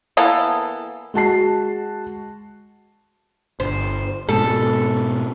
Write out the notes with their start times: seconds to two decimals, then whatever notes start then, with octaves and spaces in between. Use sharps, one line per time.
0.17 E3 A#3 B3 A4
1.14 G#3 F#4 A5 C7
3.60 G1 C5
4.29 G#2 B2 A4